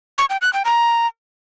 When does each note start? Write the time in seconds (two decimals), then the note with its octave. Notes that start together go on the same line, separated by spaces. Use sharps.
0.18 C#6
0.30 G5
0.42 F#6
0.53 G5
0.65 A#5